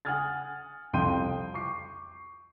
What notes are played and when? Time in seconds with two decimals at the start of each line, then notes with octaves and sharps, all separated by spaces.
0.05 F#5 G#5 D#6 F6 G#6 A6
0.93 C2 F2 G5 C6 G6 D#7
1.54 C#6 D6 C7